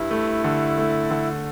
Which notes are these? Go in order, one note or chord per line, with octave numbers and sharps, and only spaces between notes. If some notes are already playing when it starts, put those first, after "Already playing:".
Already playing: G2 E4
A3
D3
A3
D3